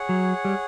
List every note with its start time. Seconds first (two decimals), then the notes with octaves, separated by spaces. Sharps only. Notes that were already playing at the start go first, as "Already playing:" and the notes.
Already playing: G#4 C#5 F#5
0.09 F#3
0.45 G3